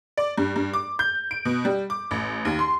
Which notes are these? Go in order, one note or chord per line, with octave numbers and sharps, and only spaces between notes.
D5
G2
G2
D6
G6
D7
B2
G3
D6
A1
D#2
C6